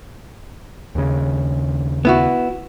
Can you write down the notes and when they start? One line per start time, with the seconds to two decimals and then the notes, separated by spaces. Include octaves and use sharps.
0.95 D#2 C#3
2.05 B3 E4 F#4